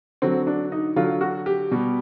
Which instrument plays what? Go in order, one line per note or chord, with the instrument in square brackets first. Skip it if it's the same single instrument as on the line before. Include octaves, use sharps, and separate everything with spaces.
[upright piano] D3 F#3 C4
D4
D#4
D3 F#3 F4
F#4
G4
B2 G3